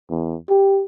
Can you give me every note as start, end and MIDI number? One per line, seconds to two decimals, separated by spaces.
0.10 0.36 40
0.49 0.84 67